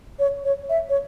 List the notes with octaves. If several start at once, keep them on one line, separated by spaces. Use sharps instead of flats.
C#5
C#5
E5
C#5